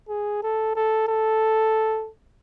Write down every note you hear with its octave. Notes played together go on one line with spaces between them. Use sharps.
G#4
A4
A4
A4